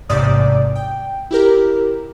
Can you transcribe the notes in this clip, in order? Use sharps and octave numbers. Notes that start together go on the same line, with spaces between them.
A1 G#2 C3 D5 D#6
G5
E4 G4 A#4